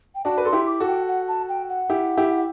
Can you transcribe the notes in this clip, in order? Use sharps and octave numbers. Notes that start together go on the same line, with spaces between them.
G5
D4 F#4 A5
B4
A4 C6
E4 G4
D6
F#4 A4
G5
F#5
A5
G5
F#5
E4 G4
E4 G4